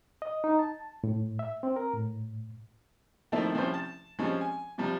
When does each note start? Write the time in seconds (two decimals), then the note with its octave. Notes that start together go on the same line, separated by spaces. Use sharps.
0.22 D#5
0.44 D#4
0.59 A5
1.04 A2
1.39 E5
1.63 C4
1.76 A#4
1.93 A2
3.32 D#3 F3 A3 A#3 C4 E4
3.54 C3 F3 G3 C#4 E4 C5
3.74 A5
4.19 F3 G3 G#3 C4 C#4
4.41 G#5
4.78 C3 F3 G3